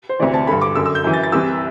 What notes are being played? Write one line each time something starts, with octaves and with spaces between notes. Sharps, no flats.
C5
D2 C3 E3 D5
A5
G2 D3 B5
D6
F#2 D3 E6
E6
G6
F#2 E3
A6
A6
C2 C3 E3 E6